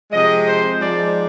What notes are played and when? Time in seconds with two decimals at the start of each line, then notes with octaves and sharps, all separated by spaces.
0.11 C3 F3 G#3 D#5
0.45 C5
0.78 G#2 F3 G#3 D5